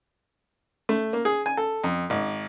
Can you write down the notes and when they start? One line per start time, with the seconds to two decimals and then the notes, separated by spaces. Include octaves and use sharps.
0.89 A3
1.13 A#3
1.25 G#4
1.46 G#5
1.57 A4
1.84 F2
2.10 G#1